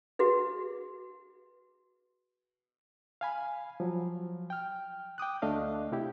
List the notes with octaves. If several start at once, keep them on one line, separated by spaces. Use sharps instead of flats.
F#4 G#4 B4
F5 G#5 B5
F3 F#3
G5 F6
G5 D6 D#6 F#6
D2 A3 D4 D#5 F5
C3 E4 G4